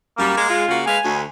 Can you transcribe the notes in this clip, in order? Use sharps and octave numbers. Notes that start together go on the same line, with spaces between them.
F#2 G3 A#3
G#3
F4
C#3 A#3 F#4
G#3 B4 F5 G#5
D2